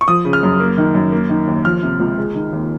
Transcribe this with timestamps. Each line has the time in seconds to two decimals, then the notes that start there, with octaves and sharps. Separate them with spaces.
0.01 C#6
0.08 F3 D#6
0.25 C#3
0.33 F6
0.43 F#2
0.60 A#3
0.78 D#3
0.95 F#2
1.12 A#3
1.29 D#3
1.47 D#2
1.65 F3 F6
1.83 C3
2.00 C#2
2.17 G#3
2.35 D#3
2.53 D#2